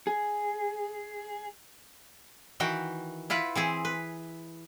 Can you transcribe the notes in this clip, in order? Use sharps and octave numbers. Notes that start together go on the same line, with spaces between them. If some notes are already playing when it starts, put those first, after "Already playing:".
G#4
D#3 E3 F#4 G5
E4 F4 B4 F#5
E3 C4 G#4
B4